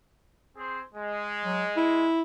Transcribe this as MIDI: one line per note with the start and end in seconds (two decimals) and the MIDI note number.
0.57 0.81 60
0.57 0.81 68
0.57 0.81 72
0.94 2.08 56
1.45 1.64 54
1.76 2.23 64